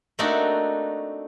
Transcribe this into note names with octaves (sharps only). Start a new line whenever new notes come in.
A3 A#3 C4 D4 D#4 F#4